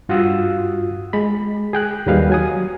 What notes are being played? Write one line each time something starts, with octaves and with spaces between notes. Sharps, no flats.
G2 F4 F#4 F#5 D#6 E6
G#3 B5
G#4 G5 F#6
D#2 D#3 F#3 G3 B4 F5
F#3 G#5 D#6